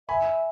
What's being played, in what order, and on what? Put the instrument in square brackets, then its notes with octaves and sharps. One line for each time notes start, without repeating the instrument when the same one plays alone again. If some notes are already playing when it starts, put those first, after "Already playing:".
[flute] E5 [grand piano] G#5 B5